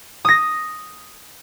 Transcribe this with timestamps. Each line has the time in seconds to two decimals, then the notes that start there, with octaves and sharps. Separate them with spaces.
0.25 D#6 A#6